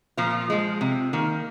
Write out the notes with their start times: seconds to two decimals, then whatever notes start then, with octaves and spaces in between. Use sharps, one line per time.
0.17 A#2 F3 F4
0.50 F3 G#3
0.81 C3
1.13 D#3 A#3